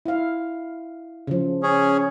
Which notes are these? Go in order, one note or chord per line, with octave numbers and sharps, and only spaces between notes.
E4 F5
C#3 F3
C#4 G#4